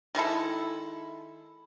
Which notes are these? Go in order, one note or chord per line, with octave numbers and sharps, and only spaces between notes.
D#3 G#3 E4 A4